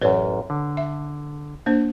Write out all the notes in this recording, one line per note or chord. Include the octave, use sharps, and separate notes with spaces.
A1 F#2 B4 C#5 D5
D3
E5
A#3 D4 C5